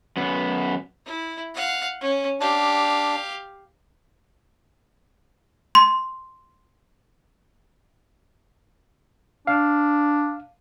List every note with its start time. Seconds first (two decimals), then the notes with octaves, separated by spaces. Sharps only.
0.17 F#2 B3
1.06 E4
1.54 F5 F#5
2.01 C#4
2.40 D4 G4 F5
5.75 C6
9.47 D4 F5